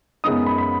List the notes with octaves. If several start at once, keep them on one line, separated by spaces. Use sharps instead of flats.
F#2 C#3 G#3 B3 D#4 D#6
B5
B5